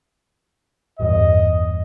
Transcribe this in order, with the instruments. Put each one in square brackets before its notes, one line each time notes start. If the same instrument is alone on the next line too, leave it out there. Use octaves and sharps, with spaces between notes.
[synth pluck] A1 E2 G2 [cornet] D#5